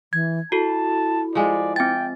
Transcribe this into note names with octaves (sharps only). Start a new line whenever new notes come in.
E3 G#6
E4 F#4 A4 A5
F3 G#3 D5
C4 G5 A6